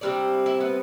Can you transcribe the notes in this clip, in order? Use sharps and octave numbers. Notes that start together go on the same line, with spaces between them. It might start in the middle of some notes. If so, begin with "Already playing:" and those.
C3 G3 C4 D4 E4 D5
E4 E5
B3 B4